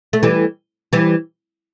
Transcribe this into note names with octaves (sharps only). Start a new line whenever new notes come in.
A3
E3 G3
E3 G3